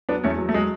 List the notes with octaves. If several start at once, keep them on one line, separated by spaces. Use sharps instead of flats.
F#3 B3 D4
E2 A3 C#4
F#3
A3
F#3 G#3